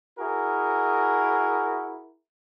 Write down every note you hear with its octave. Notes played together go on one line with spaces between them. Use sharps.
E4 F#4 G#4 A#4